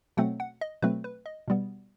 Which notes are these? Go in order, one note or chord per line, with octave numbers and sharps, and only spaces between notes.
B2 F#3 A3 C4 F#5
F#5
D#5
B2 F#3 A3 C4 B4
B4
D#5
B2 G3 B3